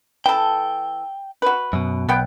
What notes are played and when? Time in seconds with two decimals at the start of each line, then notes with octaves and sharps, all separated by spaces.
0.26 E3 A4 G5
1.42 F#4 B4
1.73 F#2 B2
2.09 B1 B3 F#5 G5